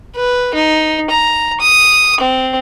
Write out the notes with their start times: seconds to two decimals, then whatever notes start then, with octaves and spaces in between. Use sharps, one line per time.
0.15 B4
0.54 D#4
1.10 A#5
1.60 D#6
2.21 C4